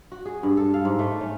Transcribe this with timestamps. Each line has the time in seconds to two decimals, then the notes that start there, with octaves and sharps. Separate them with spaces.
0.12 F#4
0.25 G#4
0.43 G2
0.57 A4
0.74 F5
0.85 G#2
0.99 A3
1.21 C#4